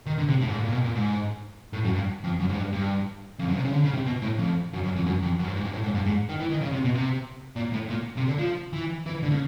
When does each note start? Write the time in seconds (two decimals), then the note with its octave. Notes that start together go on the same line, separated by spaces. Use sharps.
0.06 D#3
0.18 D3
0.28 C3
0.40 A2
0.48 G#2
0.56 A2
0.65 A#2
0.73 B2
0.84 A#2
0.96 G#2
1.73 A2
1.85 F#2
1.95 G2
2.24 F2
2.40 F#2
2.49 G#2
2.57 G2
2.73 G2
3.40 F2
3.49 F#2
3.56 C3
3.65 C#3
3.74 D3
3.85 C#3
3.95 C3
4.07 B2
4.23 A2
4.39 F2
4.74 F#2
4.84 F#2
4.96 F2
5.06 F#2
5.22 F2
5.39 F#2
5.47 G2
5.56 G#2
5.64 G2
5.73 A2
5.83 G#2
5.94 G2
6.06 G#2
6.29 D#3
6.40 E3
6.50 D#3
6.61 C#3
6.72 C3
6.84 B2
6.95 C3
7.56 A#2
7.73 A2
7.90 A#2
8.18 C3
8.28 D3
8.39 F3
8.73 E3
9.06 E3
9.23 D3
9.32 C#3